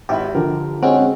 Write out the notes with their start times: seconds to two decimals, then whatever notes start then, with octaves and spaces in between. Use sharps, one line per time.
0.09 G#1 E4 G4 B5
0.35 D3 F3 A#4
0.83 G#3 C4 C#4 F#4